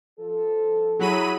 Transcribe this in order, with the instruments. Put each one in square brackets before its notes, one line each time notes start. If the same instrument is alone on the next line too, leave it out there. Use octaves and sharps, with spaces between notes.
[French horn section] F3 A4
[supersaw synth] F#3 B5 D#7 [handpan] E4 G#4